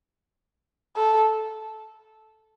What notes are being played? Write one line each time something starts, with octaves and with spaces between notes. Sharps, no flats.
A4